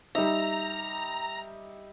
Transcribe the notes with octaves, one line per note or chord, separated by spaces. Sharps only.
G3 D#4 E5 A#5